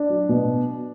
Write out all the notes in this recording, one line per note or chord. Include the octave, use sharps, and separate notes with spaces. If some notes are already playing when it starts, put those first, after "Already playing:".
Already playing: D4
F#3
B2